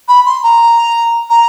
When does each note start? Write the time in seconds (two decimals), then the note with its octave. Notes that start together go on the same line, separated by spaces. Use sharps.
0.08 B5
0.26 C6
0.43 A#5
1.30 A#5